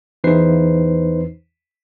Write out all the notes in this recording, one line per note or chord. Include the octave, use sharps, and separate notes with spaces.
E2 E3 D#4 B4 C5 C7